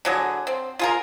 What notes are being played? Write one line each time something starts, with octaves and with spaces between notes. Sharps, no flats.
D3 F#3 G#4
C4
F4 G#4 A#4